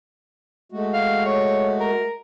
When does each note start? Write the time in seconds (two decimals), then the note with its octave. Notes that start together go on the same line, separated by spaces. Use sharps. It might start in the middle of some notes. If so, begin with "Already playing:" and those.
0.72 G#3 A3 F#4
0.93 F5
1.25 C#5
1.80 A#4